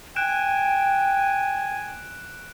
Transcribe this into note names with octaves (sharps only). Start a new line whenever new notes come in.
G5 G#5 F#6 D7 E7